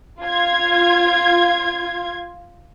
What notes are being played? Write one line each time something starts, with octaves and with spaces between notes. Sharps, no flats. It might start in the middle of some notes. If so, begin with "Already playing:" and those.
F4 G#6